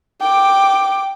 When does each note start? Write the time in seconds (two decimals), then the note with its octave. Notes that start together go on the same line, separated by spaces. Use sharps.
0.21 G5 D6